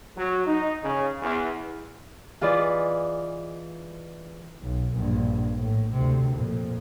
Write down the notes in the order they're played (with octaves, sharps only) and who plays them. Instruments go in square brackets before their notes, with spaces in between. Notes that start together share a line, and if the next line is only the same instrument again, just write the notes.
[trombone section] F#3
D#4
C#3
E2
[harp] E3 F4 G#4 B4 D5 D#5
[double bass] B1
A#1 G2
A2
D2 C3
F2 A#2